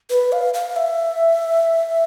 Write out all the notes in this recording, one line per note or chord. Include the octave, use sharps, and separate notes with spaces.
B4
F5
F5
E5